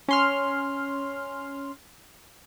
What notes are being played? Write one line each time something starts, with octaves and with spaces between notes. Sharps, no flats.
C#4 C6 F6